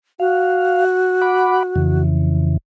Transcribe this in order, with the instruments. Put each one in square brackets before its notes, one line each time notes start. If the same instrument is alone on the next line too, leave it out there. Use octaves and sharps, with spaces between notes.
[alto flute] F#4 [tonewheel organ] F5
[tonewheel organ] F#5 B5 D6
F2 C#3 E3